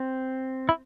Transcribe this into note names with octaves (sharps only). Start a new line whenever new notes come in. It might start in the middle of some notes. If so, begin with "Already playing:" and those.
Already playing: C4
E4